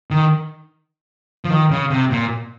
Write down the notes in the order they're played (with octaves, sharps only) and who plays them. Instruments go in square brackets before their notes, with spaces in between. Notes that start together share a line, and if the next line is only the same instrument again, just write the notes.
[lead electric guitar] D#3
F3
D#3
C#3
C3
A#2